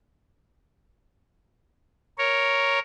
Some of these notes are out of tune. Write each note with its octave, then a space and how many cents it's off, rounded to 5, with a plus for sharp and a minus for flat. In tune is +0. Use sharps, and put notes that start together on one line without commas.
A#4 +0 C#5 +0